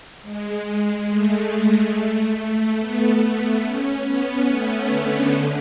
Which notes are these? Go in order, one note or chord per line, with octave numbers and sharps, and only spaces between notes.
G#3
A3
B3
B3
C#4
B3
A3
D3
D3